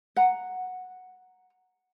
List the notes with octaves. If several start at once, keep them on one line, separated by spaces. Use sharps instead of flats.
F#5 A#5